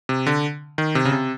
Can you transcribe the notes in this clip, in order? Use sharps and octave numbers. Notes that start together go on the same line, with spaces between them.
C3
D3
D#3
C3
C#3
C3